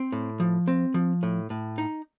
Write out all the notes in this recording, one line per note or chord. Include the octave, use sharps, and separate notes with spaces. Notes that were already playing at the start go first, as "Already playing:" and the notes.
Already playing: C4
A2
F3
C4
F3
A2
A2
D#4